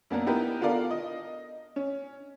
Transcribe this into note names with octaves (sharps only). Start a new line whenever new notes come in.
F#2 A#3 B3 D4 A#4
B3 D#4 E4 G4 A#4 B4
B3 F4 A4 A#4 D5 F5
D#5
C#4